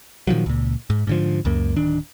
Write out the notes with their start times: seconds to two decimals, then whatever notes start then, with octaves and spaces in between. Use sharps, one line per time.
0.27 A#2 D#3 F3 F#3
0.46 C#2 A#2
0.90 G#2
1.07 G#2 D3 F3
1.45 C#2 F#2 A#3
1.76 D1 D#3 D4